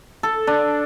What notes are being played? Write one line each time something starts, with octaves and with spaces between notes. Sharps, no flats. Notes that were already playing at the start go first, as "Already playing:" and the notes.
A4
D4